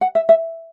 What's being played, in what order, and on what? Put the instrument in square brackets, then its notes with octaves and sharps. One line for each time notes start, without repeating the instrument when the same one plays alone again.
[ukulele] F#5
E5
E5